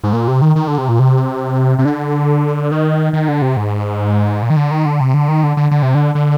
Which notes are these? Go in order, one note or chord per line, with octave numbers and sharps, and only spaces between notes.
G#2
A#2
C3
D#3
D#3
D3
C3
A#2
C3
C3
D3
D#3
D#3
D3
C3
G#2
A#2
D#3
D3
D#3
D3
C3
D3
D#3
D3
D3
D3
C3
D3
D3